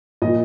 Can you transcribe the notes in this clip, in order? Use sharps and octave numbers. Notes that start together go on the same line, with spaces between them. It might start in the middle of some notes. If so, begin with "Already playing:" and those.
A#2 F3 D#5